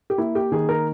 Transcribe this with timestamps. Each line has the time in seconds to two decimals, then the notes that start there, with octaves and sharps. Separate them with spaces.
0.10 G4
0.18 A#3 E4
0.35 G4
0.52 D#3 G#4
0.69 A#4